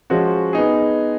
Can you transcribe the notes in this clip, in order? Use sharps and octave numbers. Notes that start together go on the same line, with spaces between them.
F3 G#3 C#4 F#4
B3 D#4 G#4